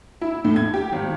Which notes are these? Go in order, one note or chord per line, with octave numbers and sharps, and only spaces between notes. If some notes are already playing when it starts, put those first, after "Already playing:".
E4
A2
G#6
G4
G#1